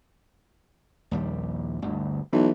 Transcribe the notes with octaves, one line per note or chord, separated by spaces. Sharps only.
A#1 D#2 G3
G1 D2
B1 E3